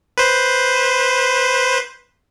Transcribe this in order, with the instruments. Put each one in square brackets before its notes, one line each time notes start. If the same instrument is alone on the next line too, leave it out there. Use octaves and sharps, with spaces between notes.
[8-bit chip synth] B4 C5